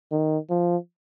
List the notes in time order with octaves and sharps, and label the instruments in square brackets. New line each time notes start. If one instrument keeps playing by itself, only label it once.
[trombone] D#3
F3